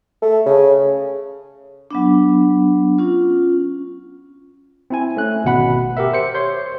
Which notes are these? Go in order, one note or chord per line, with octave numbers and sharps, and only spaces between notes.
A3
C#3
F#3 B3 D4
C#4 F4
C4 E4 G#5
A3 C#4 F#6
G#1 B2 F#5 B5
G4 A#4 E5
C5 C#7
C5 C#5 C6 G6